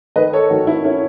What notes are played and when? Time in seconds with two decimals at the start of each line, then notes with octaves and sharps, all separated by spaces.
0.16 D#3 B4 D#5
0.33 A4 C#5
0.50 D#3 F#4 A4
0.67 E4
0.84 C#4 E4